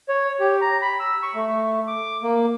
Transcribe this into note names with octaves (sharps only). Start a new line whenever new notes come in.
C#5
G4
A#5
B5
E6
C#6
A3
D6
A#3